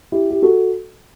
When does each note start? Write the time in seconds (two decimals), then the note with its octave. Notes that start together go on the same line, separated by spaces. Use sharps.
0.12 E4 G4
0.30 G4
0.42 F#4 A4